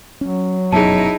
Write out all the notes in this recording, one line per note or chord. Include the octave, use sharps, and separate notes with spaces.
F#3 C#4
F1 F#2 B2 D#4 E4 G#4 A5